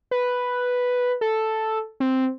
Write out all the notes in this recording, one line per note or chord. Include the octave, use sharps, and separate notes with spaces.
B4
A4
C4